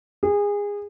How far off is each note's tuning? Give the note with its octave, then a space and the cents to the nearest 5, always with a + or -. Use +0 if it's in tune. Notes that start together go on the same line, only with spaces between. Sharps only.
G#4 -25